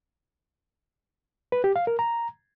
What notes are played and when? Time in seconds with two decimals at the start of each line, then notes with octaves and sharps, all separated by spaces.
1.52 B4
1.64 G4
1.76 F5
1.87 A#4
1.99 A#5